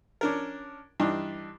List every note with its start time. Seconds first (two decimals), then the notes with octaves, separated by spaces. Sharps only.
0.21 C#4 D4 A#4
1.00 G2 E3 D4 D#4